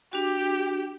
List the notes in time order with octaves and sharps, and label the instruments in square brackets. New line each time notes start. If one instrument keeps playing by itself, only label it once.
[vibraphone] D4 F#4 [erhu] G4